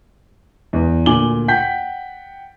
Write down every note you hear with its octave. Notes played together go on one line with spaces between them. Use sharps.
E2
D2 A#2 G#5 D6 F#7 G7
F#5 G5 G6 B6